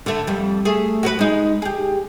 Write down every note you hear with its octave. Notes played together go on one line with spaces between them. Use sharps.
D3 A3
F2 G3
A3 G#4
F#4 G#4 B4
G#3 D#4
G4 G#4